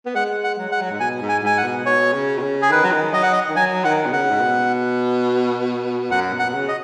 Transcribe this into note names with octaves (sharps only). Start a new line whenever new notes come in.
B3
G#3 F#5
F#5
F#3
G#3 F#5
F#3
G#2
B2 G#5
G#2
G#5
G#2 G#5
F#5
B2
B2 C#5
C#3
B2
C#3
G#4
D#3 B4
F#3
D#3
F#3 D#5
F#5
D#5
D#3
F#3 G#5
D#3 F#5
B2
C#3 F#5
G#2
B2
F#2 F#5
B2
F#5
B2
C#3
D#5